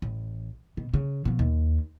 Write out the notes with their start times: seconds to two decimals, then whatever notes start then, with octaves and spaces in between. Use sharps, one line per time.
0.02 A1
0.77 B2
0.94 C#3
1.25 B2 F3
1.39 D#2